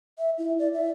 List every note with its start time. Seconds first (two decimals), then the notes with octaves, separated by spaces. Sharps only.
0.18 E5
0.38 E4
0.59 D5
0.73 E5